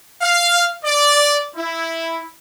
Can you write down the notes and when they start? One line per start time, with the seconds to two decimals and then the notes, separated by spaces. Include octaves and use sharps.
0.21 F5
0.85 D5
1.56 E4